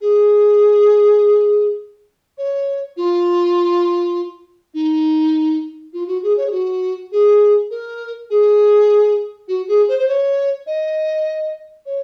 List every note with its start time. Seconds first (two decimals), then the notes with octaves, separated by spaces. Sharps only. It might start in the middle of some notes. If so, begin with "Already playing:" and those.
0.01 G#4
2.38 C#5
2.97 F4
4.74 D#4
5.93 F4
6.07 F#4
6.23 G#4
6.37 C#5
6.46 G#4
6.52 F#4
7.12 G#4
7.71 A#4
8.30 G#4
9.48 F#4
9.68 G#4
9.88 C5
9.99 C5
10.08 C#5
10.67 D#5
11.86 C#5